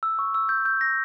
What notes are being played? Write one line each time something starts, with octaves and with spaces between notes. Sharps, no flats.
E6
C#6
E6
G6
G6
A#6